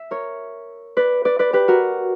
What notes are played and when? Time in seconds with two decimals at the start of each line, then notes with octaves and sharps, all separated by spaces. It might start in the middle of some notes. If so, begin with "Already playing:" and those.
Already playing: E5
0.11 A#4 C#5
0.97 B4 D5
1.25 B4 D5
1.39 B4 D5
1.53 G4 B4
1.68 F#4 A#4